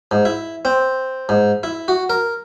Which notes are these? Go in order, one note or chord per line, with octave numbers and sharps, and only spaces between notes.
G#2
E4
C4
G#2
E4
F#4
A#4